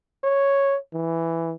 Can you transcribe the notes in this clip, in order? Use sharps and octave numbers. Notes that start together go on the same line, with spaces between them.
C#5
E3